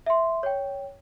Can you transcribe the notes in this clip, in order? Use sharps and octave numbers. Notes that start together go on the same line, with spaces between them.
E5 C6
C#5 G5